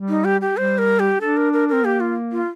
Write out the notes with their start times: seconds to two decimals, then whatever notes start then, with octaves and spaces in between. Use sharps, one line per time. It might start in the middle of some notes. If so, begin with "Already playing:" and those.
Already playing: G3
0.09 D#4
0.25 G4
0.41 G4
0.56 G3 C5
0.78 A#4
1.00 G4
1.21 D4 A4
1.37 A#4
1.53 A#4
1.69 C4 A#4
1.85 A#3 G4
2.00 F4
2.32 F4